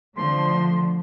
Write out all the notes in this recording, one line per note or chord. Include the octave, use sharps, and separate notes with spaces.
D3 F3 A3 C6